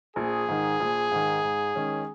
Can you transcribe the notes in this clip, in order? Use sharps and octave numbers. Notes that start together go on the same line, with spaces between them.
A#1 G#4
G#2 D#3
A#1
G#2 D#3
G#2
D#3 G#3 C#4